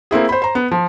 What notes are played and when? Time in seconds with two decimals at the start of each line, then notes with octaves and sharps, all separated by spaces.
0.11 A#3 C4 E4 G#4
0.29 C5 B5
0.42 C5 A#5
0.55 B3
0.71 F3